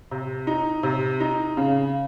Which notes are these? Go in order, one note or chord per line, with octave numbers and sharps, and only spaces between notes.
C3
D#4
C3
D#4
C#3